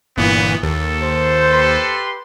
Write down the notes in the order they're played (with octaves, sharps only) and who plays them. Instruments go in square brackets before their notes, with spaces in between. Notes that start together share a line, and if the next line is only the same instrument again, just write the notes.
[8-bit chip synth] G1 A#2 E3 [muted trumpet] B3
[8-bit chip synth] D#2 [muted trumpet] A4
[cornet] C5
[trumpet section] G4 B4 C6